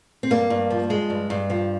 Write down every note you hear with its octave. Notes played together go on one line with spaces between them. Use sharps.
C4
G2 A#3
G2
F3
G#3
G2
G2
F3